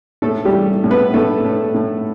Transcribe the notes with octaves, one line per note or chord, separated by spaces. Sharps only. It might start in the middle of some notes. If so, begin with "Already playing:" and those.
A2 A3 A4
G3 G4
E3
A2
B3 B4
A2 A3 A4
A2
A2